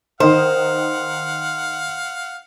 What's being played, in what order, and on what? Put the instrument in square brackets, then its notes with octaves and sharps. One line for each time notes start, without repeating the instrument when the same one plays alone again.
[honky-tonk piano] D#3 D#4 A#4 [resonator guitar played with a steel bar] C5 [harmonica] F5 F#5